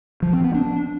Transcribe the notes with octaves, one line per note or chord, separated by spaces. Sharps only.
F3
C4
B3
D4